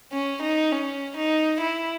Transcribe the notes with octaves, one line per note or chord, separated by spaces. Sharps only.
C#4
D#4
C#4
D#4
E4